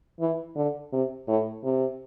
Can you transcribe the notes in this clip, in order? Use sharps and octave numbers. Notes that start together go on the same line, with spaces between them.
E3
D3
C3
A2
C3